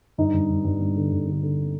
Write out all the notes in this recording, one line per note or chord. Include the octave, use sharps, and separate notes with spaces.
G2 D#4
G2
G2
G2
G2
D3
G2
D3
D3